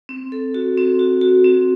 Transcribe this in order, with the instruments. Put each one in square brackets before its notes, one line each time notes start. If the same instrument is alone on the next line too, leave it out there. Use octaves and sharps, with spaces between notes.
[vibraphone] C4
A4
F#4
C4
F#4
F#4
C4